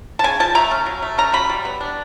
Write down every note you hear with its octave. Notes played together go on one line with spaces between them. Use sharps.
A5
C#3 G#5
F3 A5
A3 A#5
C#4
F#3
A3
C#4 A#5
F#3 B5
G3
B3
D4